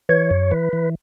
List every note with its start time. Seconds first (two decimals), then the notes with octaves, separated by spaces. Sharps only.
0.09 E3 C#5
0.31 F#2
0.51 E3 B4
0.73 E3